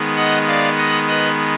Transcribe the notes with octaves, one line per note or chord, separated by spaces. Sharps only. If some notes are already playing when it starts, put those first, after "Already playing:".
Already playing: D#3 G#3 B3
D#5 F#5
D5 F5
D#5 F#5
B4 D#5